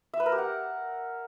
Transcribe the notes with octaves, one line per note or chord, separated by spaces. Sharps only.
E5
B4
A#4
G4
F#5